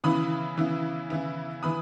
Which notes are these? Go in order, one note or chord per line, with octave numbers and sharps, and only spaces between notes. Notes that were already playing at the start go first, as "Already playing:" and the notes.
C#3 E3 B3 E4 B5 D#6
C#3 E3 B3 E4
C#3 E3 B3 E4
E3 B3 E4 B5 D#6